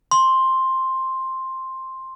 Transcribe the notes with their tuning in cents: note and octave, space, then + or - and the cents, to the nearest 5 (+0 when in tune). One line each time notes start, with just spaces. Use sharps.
C6 +5